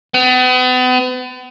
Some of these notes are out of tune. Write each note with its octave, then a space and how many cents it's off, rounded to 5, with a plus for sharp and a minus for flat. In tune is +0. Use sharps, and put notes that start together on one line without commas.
B3 +40